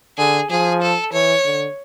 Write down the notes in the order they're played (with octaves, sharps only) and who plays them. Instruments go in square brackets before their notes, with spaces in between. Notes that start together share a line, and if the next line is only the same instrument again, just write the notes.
[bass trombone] D3 [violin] G#4
[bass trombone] F3 [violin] G#4
[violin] A4
[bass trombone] E3 [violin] C#5
[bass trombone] D3